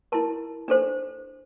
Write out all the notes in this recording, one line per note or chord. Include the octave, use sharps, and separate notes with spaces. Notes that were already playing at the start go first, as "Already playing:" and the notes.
E4 A#4 A5
D4 A4 C5